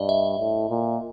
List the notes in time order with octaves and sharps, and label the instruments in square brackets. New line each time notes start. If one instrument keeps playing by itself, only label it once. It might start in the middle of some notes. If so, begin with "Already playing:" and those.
Already playing: [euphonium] G2 [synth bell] D5 D#5
[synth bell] E5
[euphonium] A2
A#2